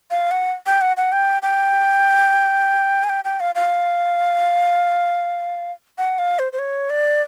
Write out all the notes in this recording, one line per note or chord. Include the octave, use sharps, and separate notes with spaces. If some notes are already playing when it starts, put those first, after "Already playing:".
F5
F#5
G5
F#5
F#5
G5
G5
G#5
G5
G5
F5
F5
F#5
F5
C5
C5
C#5
D5